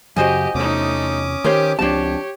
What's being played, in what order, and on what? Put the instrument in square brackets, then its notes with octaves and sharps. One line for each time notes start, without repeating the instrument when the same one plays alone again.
[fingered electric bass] F#2 C#3 F#3 [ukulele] F#4 C5 G#5 [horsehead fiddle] G4 D#5
[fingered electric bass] E2 C3 [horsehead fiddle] A3 D#4 [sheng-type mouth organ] C#4 D6 D#6
[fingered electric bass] D#3 [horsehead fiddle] G4 [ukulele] A#4 C5 C#5
[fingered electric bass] C#2 F3 C4 [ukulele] D4 A5 [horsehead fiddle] G4 C#5